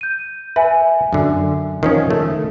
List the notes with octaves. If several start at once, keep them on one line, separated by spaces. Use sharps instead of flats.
G6 D#7
B4 E5 G#5
F#2 D3
D#3 F3 C#4
A3